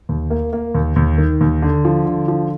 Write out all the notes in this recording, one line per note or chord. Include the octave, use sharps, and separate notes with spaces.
D#2
A#3
A#3
D#2
D#2
D#3
D#2
D3
F3
D3
F3